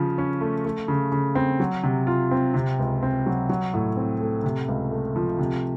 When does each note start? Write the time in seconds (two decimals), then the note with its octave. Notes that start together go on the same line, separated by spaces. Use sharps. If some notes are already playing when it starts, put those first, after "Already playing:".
Already playing: C#3 F3
0.18 C#4
0.41 A3
0.65 A3
0.88 C#3
1.12 C#3
1.35 C4
1.60 F#3
1.84 C3
2.07 F4
2.31 C4
2.54 C3
2.79 C#2
3.03 C4
3.26 F#3
3.49 F#3
3.74 A2
3.97 C4
4.21 A3
4.44 C3
4.68 C#2
4.91 A3
5.16 F3
5.39 C3